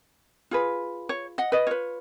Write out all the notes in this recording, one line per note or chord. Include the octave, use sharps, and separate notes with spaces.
F4 G#4 B4
C#5
D#5 F#5
B4 D#5
F4 B4 C#5